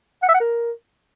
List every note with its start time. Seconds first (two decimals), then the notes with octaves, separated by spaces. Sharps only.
0.23 F#5
0.29 E5
0.34 F#5
0.40 A#4